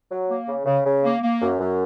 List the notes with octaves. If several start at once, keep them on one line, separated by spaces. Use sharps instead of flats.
F#3
A#3
C#3
C#3
C#3
A#3
A#3
F#2
F#2